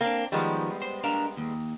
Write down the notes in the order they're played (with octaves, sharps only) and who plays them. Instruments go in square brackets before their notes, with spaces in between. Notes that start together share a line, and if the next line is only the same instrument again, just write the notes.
[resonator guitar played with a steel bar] A#3 [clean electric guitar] C4 D4
[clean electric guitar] D#3 F3 [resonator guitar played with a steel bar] G3 G#3 B3
[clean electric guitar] C5
D4 A#4 F5
D#2